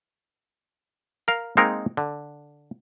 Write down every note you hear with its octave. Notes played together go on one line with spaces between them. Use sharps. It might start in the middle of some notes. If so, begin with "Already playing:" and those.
A#4 F5
G#3 A#3 C4 D#4 A#4
D3